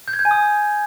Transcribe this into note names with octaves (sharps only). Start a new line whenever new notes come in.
G6
G#6
G6
G#5
D#6